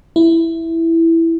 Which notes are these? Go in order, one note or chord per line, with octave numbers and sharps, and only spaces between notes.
E4